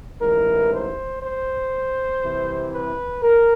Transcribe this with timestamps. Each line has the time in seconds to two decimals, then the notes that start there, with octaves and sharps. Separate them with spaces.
0.21 A1 G#2 E3 A#4
0.72 C5
1.22 C5
2.23 C2 C3 E3
2.73 B4
3.23 A#4